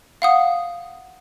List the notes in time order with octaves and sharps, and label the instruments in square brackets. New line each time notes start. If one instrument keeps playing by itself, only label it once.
[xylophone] F5 F#5 D#6